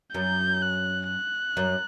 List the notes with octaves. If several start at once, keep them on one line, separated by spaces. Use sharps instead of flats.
F#2 G6
F#6
F#6
F#2